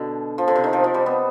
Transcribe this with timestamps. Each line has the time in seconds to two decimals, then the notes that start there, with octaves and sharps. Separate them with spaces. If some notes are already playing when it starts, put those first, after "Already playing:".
Already playing: B2 D3
0.38 F3
0.48 D3
0.56 C3
0.64 D#3
0.73 F3
0.84 F3
0.94 G3
1.06 B3